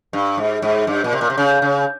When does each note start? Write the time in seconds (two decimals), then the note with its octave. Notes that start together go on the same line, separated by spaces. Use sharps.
0.13 G2
0.37 G#2
0.62 G#2
0.87 G2
1.04 A#2
1.13 C3
1.21 A#2
1.30 C3
1.38 C#3
1.62 C#3